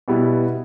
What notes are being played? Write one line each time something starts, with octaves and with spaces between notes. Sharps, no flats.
B2 G3 B3 E4